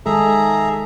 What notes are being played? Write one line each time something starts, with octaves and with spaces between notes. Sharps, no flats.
D#3 G#3 G#4 A4 E5 A#5